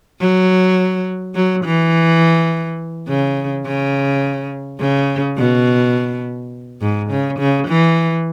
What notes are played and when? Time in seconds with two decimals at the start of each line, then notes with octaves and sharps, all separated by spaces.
0.20 F#3
1.35 F#3
1.65 E3
3.08 C#3
3.66 C#3
4.80 C#3
5.37 B2
6.81 G#2
7.10 C#3
7.39 C#3
7.68 E3